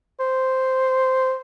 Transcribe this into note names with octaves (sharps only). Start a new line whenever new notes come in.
C5